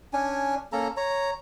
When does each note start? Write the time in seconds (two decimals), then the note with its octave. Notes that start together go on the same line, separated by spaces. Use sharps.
0.13 C#4 D4 G#5
0.72 A#3 C#4 A4 A#5
0.97 C#5 A#5